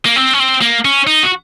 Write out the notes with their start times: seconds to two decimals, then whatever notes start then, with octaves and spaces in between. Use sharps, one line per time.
0.05 A#3
0.16 C4
0.33 C#4
0.40 C4
0.61 A#3
0.85 C#4
1.07 D#4
1.23 F#4